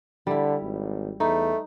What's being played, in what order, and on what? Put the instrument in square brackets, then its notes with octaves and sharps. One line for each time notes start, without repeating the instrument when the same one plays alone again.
[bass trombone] D3 [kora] G3 E4
[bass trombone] G#1
[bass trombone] E2 [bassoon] A3 [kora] D#4 B4